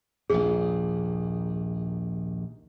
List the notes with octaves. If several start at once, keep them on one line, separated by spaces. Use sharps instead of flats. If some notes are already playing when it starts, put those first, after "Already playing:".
A#1 D#2 G#2 G#4